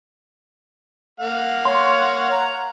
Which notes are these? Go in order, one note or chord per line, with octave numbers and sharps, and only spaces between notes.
A#3 F5 F#5
C#5 C6
A#5